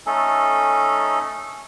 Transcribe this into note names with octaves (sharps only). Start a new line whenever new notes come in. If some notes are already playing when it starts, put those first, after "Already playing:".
A3 C#4 D#4 A4